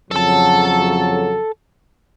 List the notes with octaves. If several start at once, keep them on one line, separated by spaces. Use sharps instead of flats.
F2 C#3 F#3 A4 A5